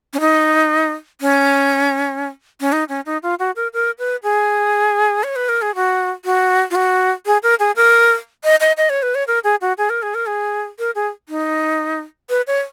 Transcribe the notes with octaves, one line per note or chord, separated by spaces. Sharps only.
C#4
D#4
C#4
C#4
D#4
C#4
D#4
F4
F#4
A#4
A#4
B4
G#4
C#5
B4
A#4
G#4
F#4
F#4
F4
F#4
G#4
A#4
G#4
A#4
D#5
D#5
D#5
C#5
B4
C#5
A#4
G#4
F#4
G#4
A#4
G#4
A#4
G#4
A#4
G#4
D#4
B4
C#5